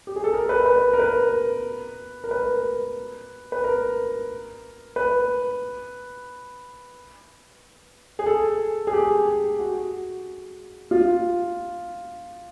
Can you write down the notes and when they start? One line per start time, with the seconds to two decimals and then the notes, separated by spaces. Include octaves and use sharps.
0.07 G4
0.16 G#4
0.24 A4
0.34 A#4
0.49 B4
0.66 B4
0.93 A#4
0.99 B4
2.24 A#4
2.31 B4
3.52 B4
3.64 A#4
4.96 B4
8.19 G#4
8.26 A4
8.87 G#4
8.93 G4
9.59 F#4
10.91 F4